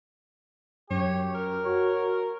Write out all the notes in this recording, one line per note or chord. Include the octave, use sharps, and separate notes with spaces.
F#2 G4 C#5
A#4
F#4 C#5